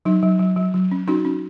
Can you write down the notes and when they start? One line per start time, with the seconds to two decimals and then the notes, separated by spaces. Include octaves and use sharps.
0.05 F#3 D#4
0.23 F#3
0.39 F#3
0.56 F#3
0.74 F#3
0.91 C#4
1.08 C#4 D#4 F#4
1.25 C#4